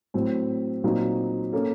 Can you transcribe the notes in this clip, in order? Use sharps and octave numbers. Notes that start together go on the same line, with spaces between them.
A2 F#3 C4
A#2 F#3 C4 D#4
A#3 C#4 A4